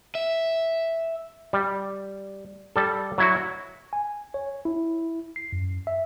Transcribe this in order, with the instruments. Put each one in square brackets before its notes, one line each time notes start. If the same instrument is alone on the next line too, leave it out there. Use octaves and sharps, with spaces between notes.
[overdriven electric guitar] E5
[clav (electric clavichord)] G3
G3 A4
F#3 E4 F#4
[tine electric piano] G#5
C#5
E4
C7
F#2
E5